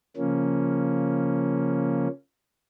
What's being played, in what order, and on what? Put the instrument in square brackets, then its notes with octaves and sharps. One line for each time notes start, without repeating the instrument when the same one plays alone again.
[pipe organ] C#3 F3 A#3 C#4